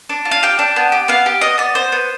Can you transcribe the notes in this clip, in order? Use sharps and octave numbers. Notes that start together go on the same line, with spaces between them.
D4
F4
F5
G4 G5
D4
B3
G4
B3 F5
G4
B3 D#5
B3 D5
B3 C5
B3